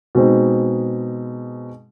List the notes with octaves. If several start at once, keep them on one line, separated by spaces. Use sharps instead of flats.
B2 G#3 C4 D#4